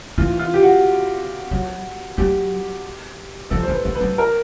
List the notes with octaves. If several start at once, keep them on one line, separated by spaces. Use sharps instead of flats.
E3 F4
F4
G4
F#4
F#3
F#3 G4
F3 A4
E3 C5
B4
D#3
B4
F#3
A#4